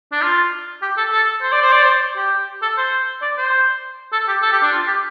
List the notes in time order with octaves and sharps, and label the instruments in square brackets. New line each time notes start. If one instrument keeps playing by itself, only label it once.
[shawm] D4
F4
G4
A4
A4
C5
D5
C5
D5
C5
G4
A4
C5
D5
C5
A4
G4
A4
G4
D4
F4
G4